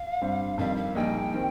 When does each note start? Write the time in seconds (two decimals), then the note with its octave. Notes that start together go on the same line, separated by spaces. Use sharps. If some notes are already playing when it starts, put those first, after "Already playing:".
Already playing: F5
0.21 G2 G3 C4
0.58 F2 D#3 G3 F5
0.77 F5
0.95 A#1 A#2 G3 D#4 G5
1.34 D#3 C4